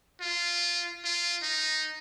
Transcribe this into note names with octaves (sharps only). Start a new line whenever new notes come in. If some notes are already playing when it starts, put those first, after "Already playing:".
F4
F4
D#4